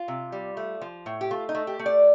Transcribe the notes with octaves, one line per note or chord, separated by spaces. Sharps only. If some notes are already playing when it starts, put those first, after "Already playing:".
Already playing: F4
C3
G3
A3
F3
A2
G4
A3 F4
D#4
A3
G4
A3
D5